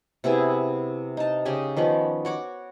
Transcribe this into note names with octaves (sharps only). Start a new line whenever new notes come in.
C3 B3 E4 G#4
D#4 A5
C#3 G4 D#5 G#5
D#3 F3 B3 C#4
F#4 C#5 D6